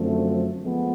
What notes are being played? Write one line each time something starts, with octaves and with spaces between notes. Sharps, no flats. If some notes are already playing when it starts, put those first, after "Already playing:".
Already playing: F#2 D3 F3 A3 C4
F3 G#3 B3